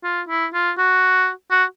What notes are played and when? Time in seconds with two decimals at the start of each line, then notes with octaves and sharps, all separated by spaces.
0.04 F4
0.29 E4
0.54 F4
0.78 F#4
1.51 F#4